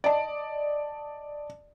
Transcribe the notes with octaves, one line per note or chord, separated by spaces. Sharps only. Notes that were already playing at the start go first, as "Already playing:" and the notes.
D5 D#5 A5